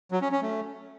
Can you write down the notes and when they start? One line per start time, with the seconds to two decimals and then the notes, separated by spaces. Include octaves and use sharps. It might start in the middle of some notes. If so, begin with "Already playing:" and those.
0.12 F#3
0.22 C#4
0.32 C#4
0.42 A3